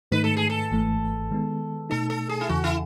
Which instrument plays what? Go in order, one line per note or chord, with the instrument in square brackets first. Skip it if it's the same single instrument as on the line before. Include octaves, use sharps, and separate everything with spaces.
[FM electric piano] G#2 D#3 A3 D#4 [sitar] B4
[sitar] A4
G#4
A4
[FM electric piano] G#1 G#2 E3 A3
D#3 G#3 B3
[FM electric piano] B2 A3 D#4 [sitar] A4
[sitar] A4
G#4
E4
[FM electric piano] E2 C#3 E3 [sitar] F#4
[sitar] E4